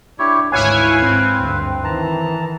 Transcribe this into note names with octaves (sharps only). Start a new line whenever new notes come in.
D4 E4 G4 C#5
G#1 D2 E4 B4 C#5 F5 G#5
G#2 C4
D2 G2
D#3 E3 A5 A#5